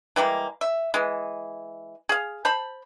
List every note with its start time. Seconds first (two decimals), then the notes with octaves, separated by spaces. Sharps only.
0.16 E3 G3 G#3 A#3
0.61 E5
0.94 E3 G#3
2.09 G#4 F5
2.45 C5 A5 B5